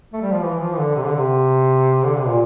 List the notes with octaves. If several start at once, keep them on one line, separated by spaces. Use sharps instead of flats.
A3
G3
F3
E3
F3
E3
D3
C3
D3
C3
D3
C3
A#2